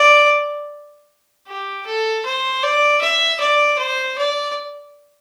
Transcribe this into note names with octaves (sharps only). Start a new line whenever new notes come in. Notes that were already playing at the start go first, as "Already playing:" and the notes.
Already playing: D5
G4
A4
C5
D5
E5
D5
C5
D5